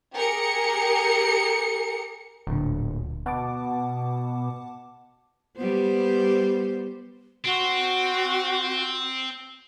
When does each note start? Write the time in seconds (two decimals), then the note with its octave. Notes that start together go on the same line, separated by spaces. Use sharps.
0.14 G4 G#4 A#4 C#7
2.47 D1 D2 A#2 D3
3.26 B2 F#5 A5 D6
5.57 G3 B3 C5
7.45 C4 F#4